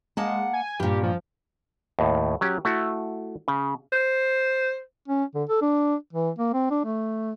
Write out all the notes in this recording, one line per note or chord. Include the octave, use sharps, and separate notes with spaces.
G#3 A#3 F#5 A5
G#5
G2 A#2 G4
F3
D#2 A2
F#3 C#4 G4
A3 E4 F#4
C#3
C5
C#4
D3
A4
D4
E3
A#3
C4
D4
A3